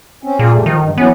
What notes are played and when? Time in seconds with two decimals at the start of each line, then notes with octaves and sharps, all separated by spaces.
0.23 C4 C#4
0.39 A#2 F4 G#4
0.53 F2 G3 A3
0.66 D#3 F3
0.81 G2
0.98 E3 F#3 B3 C#4